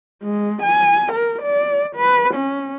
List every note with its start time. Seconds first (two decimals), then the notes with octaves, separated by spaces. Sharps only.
0.23 G#3
0.63 G#5
1.13 A#4
1.43 D5
1.96 B4
2.35 C#4